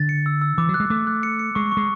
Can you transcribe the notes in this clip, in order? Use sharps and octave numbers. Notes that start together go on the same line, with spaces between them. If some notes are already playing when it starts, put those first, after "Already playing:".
Already playing: D3 A6
C#7
E6
E6
E3 D6
F#3
F#6
G#3
A3 D6
F#6
C#7
C#7
G#3 C#6
C#6
G#3